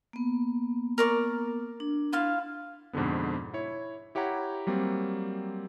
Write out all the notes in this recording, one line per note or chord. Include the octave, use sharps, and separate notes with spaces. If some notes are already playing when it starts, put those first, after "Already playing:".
A#3 B3
A#4 D5 C#6
D4
E4 F4 F5
F2 G#2 B2 D3 B3
E4 C#5
E4 G4 C#5 F#5 A#5
F#3 G3 A#3 C4